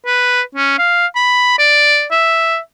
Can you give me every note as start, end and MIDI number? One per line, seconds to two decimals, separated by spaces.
0.06 0.41 71
0.55 0.77 61
0.78 1.06 77
1.16 1.58 83
1.59 2.05 74
2.11 2.58 76